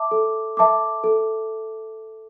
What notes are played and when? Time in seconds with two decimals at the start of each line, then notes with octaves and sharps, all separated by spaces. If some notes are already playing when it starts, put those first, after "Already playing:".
Already playing: E5 A5 D6
0.11 A4
0.57 E5 A5 D6
1.04 A4